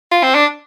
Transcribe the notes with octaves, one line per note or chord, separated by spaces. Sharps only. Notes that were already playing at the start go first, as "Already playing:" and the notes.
F4
C4
D4